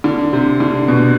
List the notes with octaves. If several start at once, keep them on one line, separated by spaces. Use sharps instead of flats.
D3
C3
D3
B2